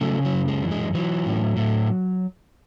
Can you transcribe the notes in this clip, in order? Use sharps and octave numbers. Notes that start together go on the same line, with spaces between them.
C#3 F#3 A3
F#3
F#2
G#3
E3
G#3
E3 F#3
A2
A2